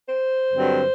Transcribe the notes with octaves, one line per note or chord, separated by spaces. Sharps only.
C5
G2 D3 F#3 C4